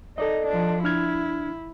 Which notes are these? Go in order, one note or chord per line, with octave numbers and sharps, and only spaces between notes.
D#4 A4 D5 D#5
F3 D4
D4 E4 F6 G#6